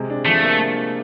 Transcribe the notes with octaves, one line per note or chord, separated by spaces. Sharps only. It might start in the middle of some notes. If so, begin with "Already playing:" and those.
Already playing: C3 G#3
D4
F3 A3
A#3